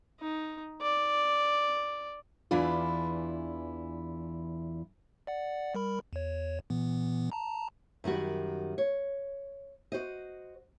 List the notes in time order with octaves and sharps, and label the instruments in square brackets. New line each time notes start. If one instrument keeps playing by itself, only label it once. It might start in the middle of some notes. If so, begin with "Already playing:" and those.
[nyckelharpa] D#4
D5
[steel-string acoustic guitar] E2 E3 D4 E4 F4
[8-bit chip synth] D5 F#5
G3 A#4 B5
E2 C#5
A#2 E3 B3
A5 A#5
[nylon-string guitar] F#2 D#3 G3 F#4
C#5
F#4 C5 D#5